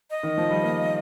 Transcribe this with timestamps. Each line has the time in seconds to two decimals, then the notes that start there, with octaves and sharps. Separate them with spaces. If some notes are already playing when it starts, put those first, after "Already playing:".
0.11 D#5
0.23 D#3
0.38 F3
0.50 G3
0.63 A#3